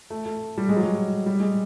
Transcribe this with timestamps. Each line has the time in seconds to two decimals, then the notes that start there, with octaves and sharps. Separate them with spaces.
0.10 A3
0.26 A3
0.58 G3
0.69 G#3
0.77 F#3
0.83 G3
1.26 G3
1.40 G#3